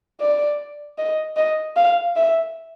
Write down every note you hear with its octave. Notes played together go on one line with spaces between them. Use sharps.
D5
D#5
D#5
F5
E5